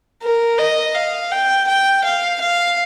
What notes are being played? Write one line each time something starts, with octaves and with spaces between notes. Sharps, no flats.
A#4
D#5
F5
G5
G5
F5
F5